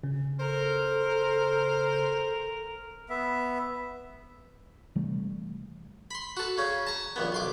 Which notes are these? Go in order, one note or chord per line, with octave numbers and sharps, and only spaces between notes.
C#3
A4 A#4 C5
B3 E5
C3 E3 G3 A3
B5 C6
F#4 A4
C#3 C#4
A5 A#5
A#1 D#2 B3
B1 C6 D6